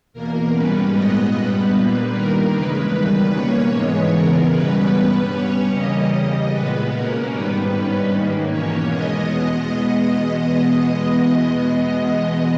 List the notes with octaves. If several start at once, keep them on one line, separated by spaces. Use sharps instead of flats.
E2 B2 A#3 A#4
G#2 G3 C#4 B4
A#2 G#3 B3 D#5
G2 G3 B3 B4
A#2 G3 A#3 B4
G2 D#3 A#3 A#4
E2 C#3 G#3 B4
E2 D#3 G3 B4
B2 A#3 C#4 C#5
G#2 E3 G#3 B3 C#5
C#3 E3 G#3 B3 A#4
E2 B2 G3 C#4 B4
G2 G3 B3 B4
G2 G3 C#4 C#5
E2 C#3 G3 A#3 C#4 D#5
E2 C#3 G3 D#5
A#2 G#3 B3 B4
B2 A#3 C#4 A#4
G#2 D#3 G3 B3 B4
G2 G3 C#4
G#2 D#3 A#3
E2 B2 A#3 C#4 C#5
E2 B2 G#3 B3 D#5